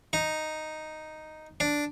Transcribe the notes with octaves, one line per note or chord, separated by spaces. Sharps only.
D#4
D4